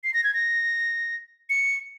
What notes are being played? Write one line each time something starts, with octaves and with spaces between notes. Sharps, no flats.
C7
A#6
G#6
A#6
C#7